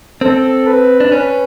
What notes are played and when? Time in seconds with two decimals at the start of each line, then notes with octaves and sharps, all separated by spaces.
0.21 C4 A4
0.67 B4
1.00 D4
1.12 C#4 B4